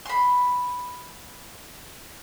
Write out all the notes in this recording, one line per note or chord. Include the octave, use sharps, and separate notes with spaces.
B5 C6